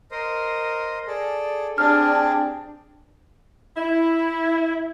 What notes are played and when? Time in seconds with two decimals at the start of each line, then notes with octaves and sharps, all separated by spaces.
0.11 A#4 C5 D#5
1.07 G#4 A4 D5
1.78 C4 D4 G4 G#4 F6
3.75 E4